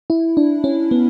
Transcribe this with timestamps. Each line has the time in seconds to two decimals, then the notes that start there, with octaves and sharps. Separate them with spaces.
0.10 E4
0.37 D4
0.64 C#4
0.91 B3